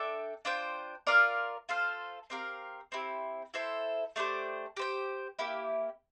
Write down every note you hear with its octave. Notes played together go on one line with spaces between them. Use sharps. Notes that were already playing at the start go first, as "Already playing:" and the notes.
Already playing: D4 A4 E5 G5
D4 F4 C5 G5
F4 A#4 D5 F5
F4 A4 C5 F5
C4 G4 A#4 F5
C4 E4 G4
E4 A4 C5 E5
A3 D4 G4 C5
G4 C5 G5
A#3 E4 G4